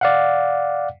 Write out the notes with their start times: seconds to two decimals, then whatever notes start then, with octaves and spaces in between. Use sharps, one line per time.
0.01 D5 F5 F#5